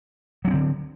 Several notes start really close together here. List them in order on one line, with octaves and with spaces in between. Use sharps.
F#3 C#4 C4 D3